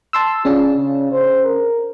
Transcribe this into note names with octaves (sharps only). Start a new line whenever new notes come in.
A5 C6 E6
C#4 D4 F4 G#4
C#3
C5
A#4